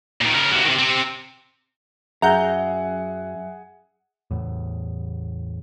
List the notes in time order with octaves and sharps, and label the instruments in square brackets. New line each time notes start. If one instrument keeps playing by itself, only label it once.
[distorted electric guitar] A#2 D#3
C#3 A#4
C3 F#3
C3 D#3
C3 C4
[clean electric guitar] F#2 [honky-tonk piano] G#4 F#5 [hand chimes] E5 [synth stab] A#5 G6
[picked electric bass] E2 A2